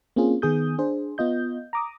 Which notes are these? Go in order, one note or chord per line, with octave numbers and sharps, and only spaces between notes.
A#3 C4 C#4 F4 G#4
D#3 B3 G#4 D#6 G6
D4 G#4 C5
B3 F4 D#5 G6
A#5 D6 D#6